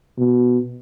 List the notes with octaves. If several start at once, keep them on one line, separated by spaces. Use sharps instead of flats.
B2